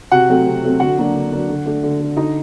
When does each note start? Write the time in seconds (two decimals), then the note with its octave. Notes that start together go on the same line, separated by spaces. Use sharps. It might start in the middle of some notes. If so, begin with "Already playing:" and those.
0.12 C3 F#4 F#5
0.29 F#3 A3 C4
0.47 C3
0.63 F#3 A3 C4
0.80 D3 F#4 F#5
0.97 F#3 A#3 D4
1.15 D3
1.32 F#3 A#3 D4
1.49 D3
1.66 A3 D4
1.83 D3
2.00 A3 D4
2.16 D3 D#4 D#5